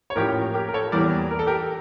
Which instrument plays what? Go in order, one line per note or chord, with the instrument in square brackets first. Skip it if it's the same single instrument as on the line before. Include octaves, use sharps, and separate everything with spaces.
[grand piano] C#5
A2 F3 A#3 C#4 G4 A#4
G4 A#4
A#4
A4 C#5
E2 E3 G3 A#3 A#4 D5
A#4
A4
G4 A#4